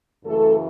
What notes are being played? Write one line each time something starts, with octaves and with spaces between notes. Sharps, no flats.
F#2 C#3 E3 A3 A4